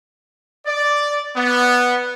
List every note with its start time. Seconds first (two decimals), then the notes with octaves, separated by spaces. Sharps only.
0.66 D5
1.36 B3